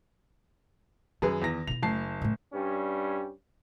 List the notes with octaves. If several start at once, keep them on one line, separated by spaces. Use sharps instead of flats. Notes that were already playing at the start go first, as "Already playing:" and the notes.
F#2 D#3 G#4 B4
E2 A#6
B2 E4 F7
F#1 A3 A5 C7
A2 A3
G2 G3 C#4